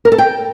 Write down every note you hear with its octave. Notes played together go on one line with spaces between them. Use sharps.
A#4
A4
G5